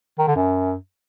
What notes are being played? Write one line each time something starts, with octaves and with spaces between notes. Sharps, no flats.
D#3
D3
F#2